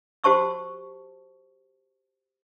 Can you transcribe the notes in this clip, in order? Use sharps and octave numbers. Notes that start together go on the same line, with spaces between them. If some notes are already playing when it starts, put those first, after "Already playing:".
F#4 G4 C5 A5 C#6 E6